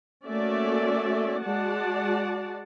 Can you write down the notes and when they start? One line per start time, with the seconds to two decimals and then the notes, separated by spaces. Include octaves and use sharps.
0.25 A3 A#3 C#4 F#4 D5 E5
1.41 G#3 F#4 D5 F#5 A5